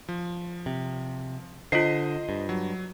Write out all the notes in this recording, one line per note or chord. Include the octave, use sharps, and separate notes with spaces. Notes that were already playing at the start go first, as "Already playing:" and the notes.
F3
C3
D3 F4 C5 D#5 C7
G2
F#3